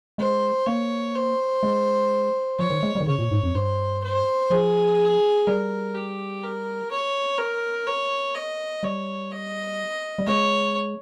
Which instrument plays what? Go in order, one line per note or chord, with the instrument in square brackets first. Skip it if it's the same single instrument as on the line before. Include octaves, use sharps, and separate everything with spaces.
[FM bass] G#3 [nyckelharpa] C5
[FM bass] A#3 [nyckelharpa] C#5
[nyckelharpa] C5
[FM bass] G#3
[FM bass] F3 [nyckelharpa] C#5
[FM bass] D#3
G#3
G3
D#3
[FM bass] C#3 [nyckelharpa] C#5
[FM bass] A#2
G#2
F2
[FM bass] G2 [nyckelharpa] C5
[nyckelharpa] C5
[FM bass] F3 [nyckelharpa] G#4
[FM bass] G3 [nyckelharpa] A#4
[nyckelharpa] G4
A#4
C#5
A#4
C#5
D#5
[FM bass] G3 [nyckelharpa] C#5
[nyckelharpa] D#5
[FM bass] G3
[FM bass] G#3 [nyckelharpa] C#5